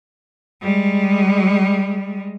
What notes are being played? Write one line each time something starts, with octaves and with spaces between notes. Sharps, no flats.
G3 G#3